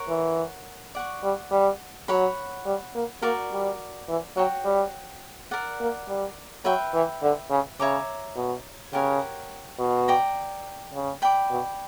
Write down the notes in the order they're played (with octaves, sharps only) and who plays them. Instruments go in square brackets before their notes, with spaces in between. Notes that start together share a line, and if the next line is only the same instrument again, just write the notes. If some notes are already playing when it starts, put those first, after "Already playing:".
Already playing: [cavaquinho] A#4 C#5 F#5 C#6
[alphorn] E3
[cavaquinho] D5 F#5 C#6
[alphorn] G3
G3
[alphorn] F#3 [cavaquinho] C#5 F#5 B5
[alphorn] G3
A#3
[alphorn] A#3 [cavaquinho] F#4 A#4 D5
[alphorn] G3
E3
[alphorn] F#3 [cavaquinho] F#4 C#5 G5
[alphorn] G3
[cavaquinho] A#4 D5 F#5
[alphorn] A#3
G3
[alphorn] F#3 [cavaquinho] B4 E5 G5
[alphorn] E3
D3
C#3
[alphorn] C#3 [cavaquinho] C#5 E5 A#5 D6
[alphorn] B2
[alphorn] C#3 [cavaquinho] G4 A#4 C#5 F#5
[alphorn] B2
[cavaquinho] D5 G5 A#5
[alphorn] C#3
[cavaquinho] D5 G5 B5
[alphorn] B2